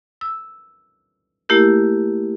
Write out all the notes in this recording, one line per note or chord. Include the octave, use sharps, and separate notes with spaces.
E6
A3 A#3 E4 G4 A#4